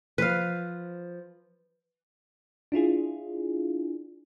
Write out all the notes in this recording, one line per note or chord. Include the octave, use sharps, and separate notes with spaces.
F3 B4 F5
D4 E4 F4 G#4